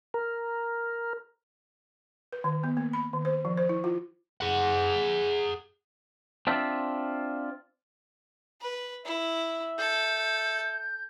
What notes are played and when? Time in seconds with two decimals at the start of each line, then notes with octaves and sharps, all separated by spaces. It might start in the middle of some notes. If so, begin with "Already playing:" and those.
0.14 A#4
2.32 B4
2.44 D#3
2.64 B3
2.77 A#3
2.93 B5
3.13 D#3
3.25 C5
3.45 F3
3.58 C5
3.69 E4
3.84 F4
4.41 G#4 F#5
6.47 C4 D4 F4 E5
8.61 B4
9.06 E4 E5
9.78 A4 G6